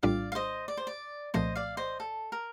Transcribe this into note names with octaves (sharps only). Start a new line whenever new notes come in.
A#1 A2 G3 D4 F4 D5 F5
F5
C5 D#5
D5
C5
D5
C2 A#2 F3 A3 C5 D#5
D5 F5
C5 D#5
A4
A#4